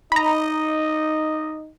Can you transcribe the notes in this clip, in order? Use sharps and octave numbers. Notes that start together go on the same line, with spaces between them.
D#4 D#5 A#5 B5